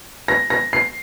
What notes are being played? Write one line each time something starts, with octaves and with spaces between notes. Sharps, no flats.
A#6
A#6
C7